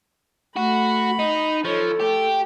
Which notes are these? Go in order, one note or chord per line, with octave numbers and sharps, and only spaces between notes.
A3 F#4 B5
D#4
F3 A4 C#5
A3 G4